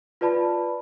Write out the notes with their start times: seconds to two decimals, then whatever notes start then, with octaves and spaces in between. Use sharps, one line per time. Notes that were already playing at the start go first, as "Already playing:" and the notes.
0.21 F4 B4 D5 A5 B5